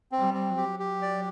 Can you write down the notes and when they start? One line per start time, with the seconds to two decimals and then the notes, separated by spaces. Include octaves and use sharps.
0.12 C4
0.18 G3
0.34 C4
0.49 F#3
0.57 G4
0.80 G4
1.02 D5